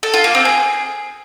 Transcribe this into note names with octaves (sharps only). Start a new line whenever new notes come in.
A4
F4
A#3
C4
G#4